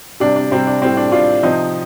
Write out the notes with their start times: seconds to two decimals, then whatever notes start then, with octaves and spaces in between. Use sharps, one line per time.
0.20 C3 G3 D4
0.36 D4
0.51 C3 G3 C4
0.67 D4
0.82 A2 G3 C4
0.97 D4
1.12 A2 G3 D4 F4
1.43 C3 F3 C4 D#4